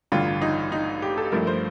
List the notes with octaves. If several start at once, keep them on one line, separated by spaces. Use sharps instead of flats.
A1 G2 D3 F4
D#4
D#4
G4
A4
G2 F3 A3 A#4
C5